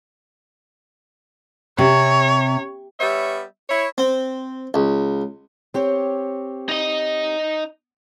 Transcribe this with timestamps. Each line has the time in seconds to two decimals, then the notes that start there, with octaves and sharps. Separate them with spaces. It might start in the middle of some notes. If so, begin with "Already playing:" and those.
1.78 C3 C#5
3.00 G3 B3 C#5 E5
3.69 E4 C#5
3.98 C4
4.74 C#2
5.74 C4 G4 C#5
6.69 D#4 D#5